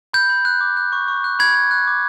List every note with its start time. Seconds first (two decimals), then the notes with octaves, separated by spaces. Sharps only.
0.14 B5 G6
0.29 B5
0.45 F#6
0.61 D6
0.77 F#6
0.92 C#6
1.08 C#6
1.24 F#6
1.39 B5 G#6
1.55 B5
1.71 F#6
1.87 D6